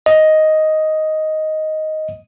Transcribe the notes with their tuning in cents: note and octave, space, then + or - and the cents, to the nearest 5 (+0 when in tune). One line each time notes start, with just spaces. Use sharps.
D#5 +5